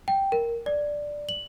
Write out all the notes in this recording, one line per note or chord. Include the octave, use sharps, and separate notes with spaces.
G5
A#4
D5
F#7